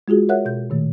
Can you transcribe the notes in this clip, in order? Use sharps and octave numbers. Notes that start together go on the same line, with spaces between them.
G#3 F4 F#4 G#4
A#4 C#5 E5 F#5 F#6
B2 G6
A#2 D#3 A3